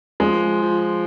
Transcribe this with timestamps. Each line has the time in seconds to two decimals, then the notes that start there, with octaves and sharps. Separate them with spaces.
0.20 F3 G#3
0.62 F3